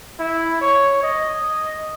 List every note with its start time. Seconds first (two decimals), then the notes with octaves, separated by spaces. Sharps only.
0.20 E4
0.61 C#5
1.03 D#5